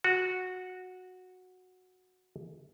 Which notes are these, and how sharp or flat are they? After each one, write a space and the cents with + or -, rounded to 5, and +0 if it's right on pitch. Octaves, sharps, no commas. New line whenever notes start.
F#4 -10